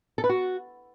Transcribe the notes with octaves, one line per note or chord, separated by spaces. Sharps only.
A4
B4
F#4